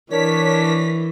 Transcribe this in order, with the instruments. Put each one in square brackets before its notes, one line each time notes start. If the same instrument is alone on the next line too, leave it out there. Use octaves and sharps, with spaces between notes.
[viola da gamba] E3 [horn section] D4 C#5 [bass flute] A#4 [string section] B6